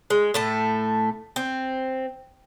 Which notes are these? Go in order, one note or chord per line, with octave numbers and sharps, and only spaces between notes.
G#3
A2 A3 A5
C4